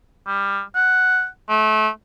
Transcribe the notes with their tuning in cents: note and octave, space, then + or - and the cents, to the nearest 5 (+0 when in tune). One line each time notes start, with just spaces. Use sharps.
G3 +20
F#5 +0
A3 -30